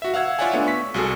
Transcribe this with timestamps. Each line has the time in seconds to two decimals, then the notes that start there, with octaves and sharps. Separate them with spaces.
0.02 F#4 E5
0.14 F5 F#5 E6 G#6
0.39 F4 C#5 D5 E5 F#5 G#5
0.53 A3 B3 D4
0.67 C#6 B6
0.94 C2 F#4 G#4 A4